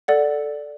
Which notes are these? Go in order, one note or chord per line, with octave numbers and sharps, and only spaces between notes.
A4 D5 F#5